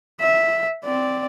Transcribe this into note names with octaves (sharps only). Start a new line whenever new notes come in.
E5
C4 D5